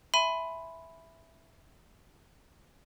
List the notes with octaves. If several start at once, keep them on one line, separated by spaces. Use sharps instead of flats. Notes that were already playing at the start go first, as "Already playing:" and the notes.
E5 G#5 B5 C6 D#7